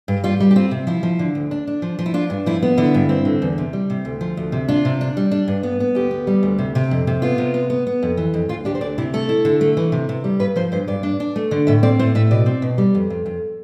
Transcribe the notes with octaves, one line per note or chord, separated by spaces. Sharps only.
G2
G3 F4
G3
G4
C4 F4
C3
F3 E4
F3
D3
D2
D4
D4
F3
F3
E4
D4 F4
G2
F3 E4
B3
D3 E4
G2
C4
D3
E2
C3
G3
C3
D2
F3
D2
C3
D4 F4
C3
D4
G3
D4
G2
B3
B3
D2 G4
B3
G3
D2
C3
C3
F2
C3
B3 F4
C3
B3
B3
B3
F2
E3
F2
D2 F4
D4 G4
C5
D2 D5
C3 E4
A3 A4
E4
D3
A3
E3
C3
C3
G3
G2 B4
F3 C5
G2 C5
G2 D5
D4
D4
A3
D3
A2 E5
C4 D5
A2 C5
A2 E5
B2 D5
C4
B2
G3
F2
F2
F2